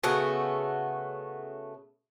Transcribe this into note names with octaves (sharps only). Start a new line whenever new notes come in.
C#3 A3 B3 F#4